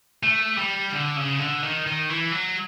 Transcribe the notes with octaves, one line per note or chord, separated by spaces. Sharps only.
A3
G3
D3
C#3
D3
D#3
D#3
E3
F#3